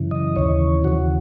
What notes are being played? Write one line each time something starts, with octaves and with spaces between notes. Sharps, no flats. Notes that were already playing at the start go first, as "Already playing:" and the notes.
Already playing: F#2 C#3 E3
D#5
D#2 C#3 E3 C#5
D#2 C#3 E3 F#4